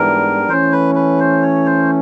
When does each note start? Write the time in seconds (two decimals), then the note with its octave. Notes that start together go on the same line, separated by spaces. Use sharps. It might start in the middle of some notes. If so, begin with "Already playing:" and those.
Already playing: G#2 E3 G3 B3 D4 A#4
0.49 E3 A3 C#4 C5
0.72 B4
0.95 B4
1.20 C5
1.42 C#5
1.66 C5